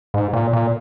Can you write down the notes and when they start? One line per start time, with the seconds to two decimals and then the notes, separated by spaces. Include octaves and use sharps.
0.14 G#2
0.33 A#2
0.53 A#2